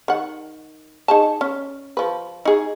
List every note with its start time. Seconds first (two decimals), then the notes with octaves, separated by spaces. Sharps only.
0.08 D#3 F#5
1.08 D#4 G#4 A5
1.41 C#4
1.97 F3 B4
2.45 D#4 G#4